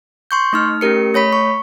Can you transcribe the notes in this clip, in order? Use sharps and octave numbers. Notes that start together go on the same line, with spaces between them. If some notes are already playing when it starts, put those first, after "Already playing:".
C6 C#6 G6
A3 D#4 F6
A3 C#4 G4 A#4 C#7
A3 C#5 B5 B6
C#6